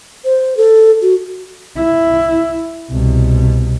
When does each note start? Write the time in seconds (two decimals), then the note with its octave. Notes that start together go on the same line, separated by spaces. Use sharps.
0.25 C5
0.57 A4
1.02 F#4
1.77 E4
2.90 C2 B2